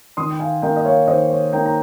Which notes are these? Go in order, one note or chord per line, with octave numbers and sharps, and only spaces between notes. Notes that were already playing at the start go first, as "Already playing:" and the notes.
D#3 C6 D#6
G5
F5 G#5
A#3 D#4 D#5 G5
D#5
C#5 F5
D#3 C5 D#5
C#5
A#3 D#4 G5 A#5
A#5